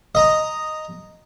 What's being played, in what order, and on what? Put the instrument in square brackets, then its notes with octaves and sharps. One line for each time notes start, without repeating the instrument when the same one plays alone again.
[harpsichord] D#5 A#5